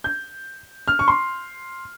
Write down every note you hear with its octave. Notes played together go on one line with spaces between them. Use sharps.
G6
F6
C#6
C6